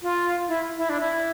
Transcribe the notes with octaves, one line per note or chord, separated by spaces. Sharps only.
F4
E4
E4
D4
E4